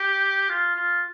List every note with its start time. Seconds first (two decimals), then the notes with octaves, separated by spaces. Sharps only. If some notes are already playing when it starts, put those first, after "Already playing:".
Already playing: G4
0.49 F4
0.75 F4